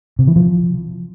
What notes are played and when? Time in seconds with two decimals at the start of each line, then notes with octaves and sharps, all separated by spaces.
0.19 C3
0.27 E3
0.36 F3